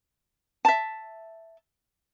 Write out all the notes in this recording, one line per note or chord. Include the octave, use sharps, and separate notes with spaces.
E5 A5